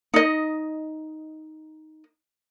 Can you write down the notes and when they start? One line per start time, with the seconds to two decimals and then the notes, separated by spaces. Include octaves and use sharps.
0.14 D#4 D#5